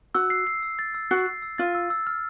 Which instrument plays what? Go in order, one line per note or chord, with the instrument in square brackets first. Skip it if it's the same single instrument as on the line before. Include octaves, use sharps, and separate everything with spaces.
[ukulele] F#4 [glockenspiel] E6
[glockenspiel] C7
C7
E6
A6
E6
[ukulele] F#4 [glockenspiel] C7
[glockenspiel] C7
E6
[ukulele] F4 [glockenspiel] A6
[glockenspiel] E6
E6
F6